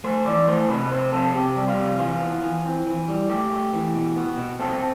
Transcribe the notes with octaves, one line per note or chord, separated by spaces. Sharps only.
A3 C5
E3 D5
A3 C5
C3 B4
C4 C5
C3 A4
C3 G4
G3
F4
C3
E3 F4
B3
E3
C4
E3
G3
A3 G4
A3
E3
B2
B3
B2
C4 A4